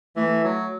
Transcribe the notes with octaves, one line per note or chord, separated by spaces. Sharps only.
E3 A3
F#3